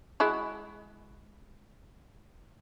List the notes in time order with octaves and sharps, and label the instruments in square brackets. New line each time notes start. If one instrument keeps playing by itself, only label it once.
[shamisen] G#3 E4 F#4